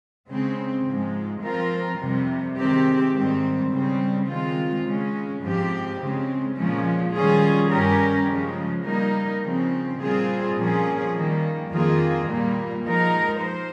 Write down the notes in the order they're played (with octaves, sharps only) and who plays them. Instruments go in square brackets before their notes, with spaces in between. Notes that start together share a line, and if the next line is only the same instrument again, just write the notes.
[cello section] C#3 G#3 C4
G#2 F3 G#3
F3 C4 F4 A#4
F2 C3 G3
C3 D#3 G#3 C4 G4
G#2 D#3 G3 C4
C#3 G3 C4
D#3 G#3 C4 F4
C#3 G#3 C#4
G#2 F3 C4 G4
C#3 G#3 C4
A#2 F3 G#3 C#4
D#3 G3 C#4 F4 G#4
G2 G3 C#4 G4 A#4
C#3 F3 G#3
G3 A#3 D#4 A#4
C#3 F3 C4
A#2 G3 C4 F4 G#4
A#2 F3 A#3 C#4 G#4
D#3 G3 A#3
F2 D#3 A#3 F4 G#4
A#2 G3 A#3
F3 G#3 D#4 A#4
C5